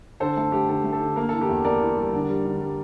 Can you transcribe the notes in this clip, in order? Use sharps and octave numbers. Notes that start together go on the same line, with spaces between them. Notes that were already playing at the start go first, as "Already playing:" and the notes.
D3 A4 C5
A3 A4
A3 G4
D3 A4
A3
A4
D3
A#3 A#4
E3 A4
G4 A#4
E2
A#3 A#4 D5
E3
G3
D3
G3
D3
G3